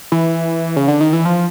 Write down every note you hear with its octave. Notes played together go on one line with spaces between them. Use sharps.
E3
C#3
D3
D#3
E3
F3